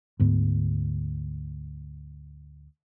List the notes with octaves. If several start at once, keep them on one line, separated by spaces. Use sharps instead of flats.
D2 G#2 B3